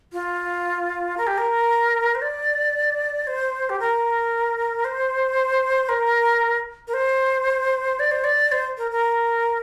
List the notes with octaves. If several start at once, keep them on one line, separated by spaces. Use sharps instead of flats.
F4
A#4
G4
A#4
C5
D5
C5
G4
A#4
C5
A#4
A#4
C5
D5
C5
D5
C5
A#4
A#4